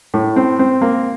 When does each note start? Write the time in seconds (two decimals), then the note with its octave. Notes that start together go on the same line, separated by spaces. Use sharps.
0.14 A2
0.36 C4
0.59 C4
0.81 A#3